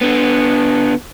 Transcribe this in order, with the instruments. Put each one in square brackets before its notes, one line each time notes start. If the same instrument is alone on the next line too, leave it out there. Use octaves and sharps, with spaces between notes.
[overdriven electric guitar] D3 B3